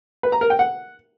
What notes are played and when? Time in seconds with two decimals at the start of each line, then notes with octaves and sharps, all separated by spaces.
0.23 B4
0.32 A#5
0.41 A#4
0.50 G5
0.59 F#5